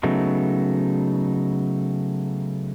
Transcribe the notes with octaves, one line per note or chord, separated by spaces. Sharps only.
C#3 F#3 A3 B3 D#4